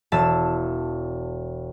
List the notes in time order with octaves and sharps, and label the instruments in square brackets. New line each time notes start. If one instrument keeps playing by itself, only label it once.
[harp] E1 A5 E6